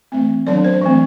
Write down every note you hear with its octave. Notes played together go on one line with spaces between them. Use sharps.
E3 A3 C4
D#3 F#3 B3 D4 D5
C5
E3 A3 C4